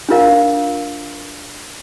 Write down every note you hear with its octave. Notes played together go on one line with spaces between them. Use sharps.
D4 F4 A#4 F5